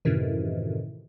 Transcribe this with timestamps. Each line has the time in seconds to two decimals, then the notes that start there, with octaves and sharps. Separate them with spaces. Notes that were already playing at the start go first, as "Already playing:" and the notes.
0.05 F#2 A2 C3 D#3 E3